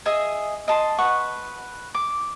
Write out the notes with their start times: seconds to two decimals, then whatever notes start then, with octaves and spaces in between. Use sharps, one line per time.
0.06 G#4 D#5 E5 G#5
0.68 D#5 A5 C6
0.98 B4 F#5 C#6
1.94 D6